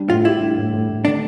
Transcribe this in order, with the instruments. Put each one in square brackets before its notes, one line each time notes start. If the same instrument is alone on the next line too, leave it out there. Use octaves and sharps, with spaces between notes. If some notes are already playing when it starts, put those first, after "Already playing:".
Already playing: [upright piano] G3 D4
[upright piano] A2 [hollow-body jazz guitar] F4
[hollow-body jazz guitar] E4 [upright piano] G4
[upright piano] D4
A2
A2
A2
[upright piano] D3 [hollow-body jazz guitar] D4